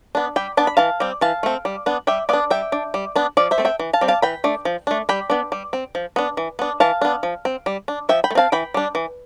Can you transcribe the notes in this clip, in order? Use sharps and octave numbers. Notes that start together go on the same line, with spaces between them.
B3 D4
G3 G5 B5
B3 D4 A5
B5
E3 F5 A5
G3 C4
E3 F5 A5
A3 C4
G3
B3 D4
G3 E5 G5
B3 D4 D5 F5
G3 E5 G5
D4
G3
B3 D4
F3 D5 F5
C5 E5
A3 C4
E5 G5
E3
F5 A5
G3 C4
F5 A5
E3 G5 B5
A3 D4
F3
A3 D4
G3 G5 B5
B3 D4
G3
C4
F3
B3 D4
E3
B3 D4
E3 F5 A5
B3 D4
F3
C4
G3
D4
F3 E5 G5
G5 B5
A3
C4 F5 A5
E3 G5 B5
G3 D4
E3